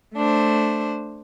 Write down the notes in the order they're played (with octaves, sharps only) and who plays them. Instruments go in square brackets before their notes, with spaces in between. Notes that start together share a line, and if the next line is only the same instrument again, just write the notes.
[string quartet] A3 D4 C5